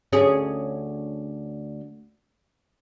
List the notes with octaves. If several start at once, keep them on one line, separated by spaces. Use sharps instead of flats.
D2 C#4 G#4